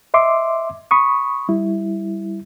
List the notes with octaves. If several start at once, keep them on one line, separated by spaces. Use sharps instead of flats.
D#5 E5 C6 D6
B5 C#6 D#6
G3 E4